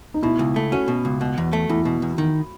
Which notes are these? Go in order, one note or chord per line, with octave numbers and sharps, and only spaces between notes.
D#4
B2 E4
C#2
A3
C#4 F#4
B2
C#2
B2
E2
A3
E2 E4
B2
E2
D#3